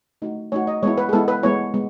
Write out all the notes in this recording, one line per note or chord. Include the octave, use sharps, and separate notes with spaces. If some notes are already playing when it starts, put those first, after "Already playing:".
A3 D#4 F#4
A3 D#4 F#4 C#5
D#5
G#3 B3 E4 C#5
B4
G#4
G#3 B3 E4 A4
B4
G#3 B3 E4 C#5
G#3 B3